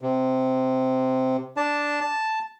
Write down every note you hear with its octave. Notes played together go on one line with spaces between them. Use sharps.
C3
D4 A5
A5